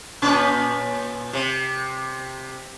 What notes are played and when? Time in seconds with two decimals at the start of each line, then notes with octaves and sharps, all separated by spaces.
0.22 A#2 C#4 B4
1.33 C3